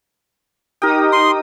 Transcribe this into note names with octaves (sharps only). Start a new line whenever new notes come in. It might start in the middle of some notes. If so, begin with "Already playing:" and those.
D#4 G4 A#4 G5 D#6
C6